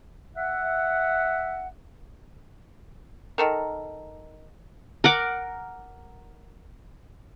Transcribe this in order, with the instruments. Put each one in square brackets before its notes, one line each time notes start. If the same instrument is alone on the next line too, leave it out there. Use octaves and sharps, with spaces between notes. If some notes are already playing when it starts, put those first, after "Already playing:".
[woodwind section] E5 F#5
[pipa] D#3 A4 A#4
[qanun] A#4 F#5 D6